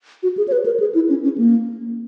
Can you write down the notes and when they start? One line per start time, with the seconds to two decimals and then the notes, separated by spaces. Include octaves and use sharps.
0.23 F#4
0.37 G#4
0.48 C#5
0.52 B4
0.66 A#4
0.80 G#4
0.95 E4
1.09 C#4
1.23 C#4
1.38 A#3